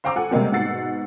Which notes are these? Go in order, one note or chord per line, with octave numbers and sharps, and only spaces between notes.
C5 F5 G5 A#5 D6 E6
A4 F#5 G#5
C3 G3 G#3 A#3 C4
G#2 B2 F#5 E6 A6 C7